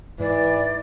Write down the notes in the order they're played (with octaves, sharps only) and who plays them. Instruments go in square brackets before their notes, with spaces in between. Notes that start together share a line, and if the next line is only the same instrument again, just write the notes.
[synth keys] G#2 [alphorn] E3 [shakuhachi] D5